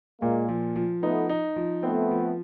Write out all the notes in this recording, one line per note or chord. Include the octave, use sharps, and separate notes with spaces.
A#2 G#3 A#3
F3
F3
A3 B3 D#4
D#4
F3
A3 B3 C4
F3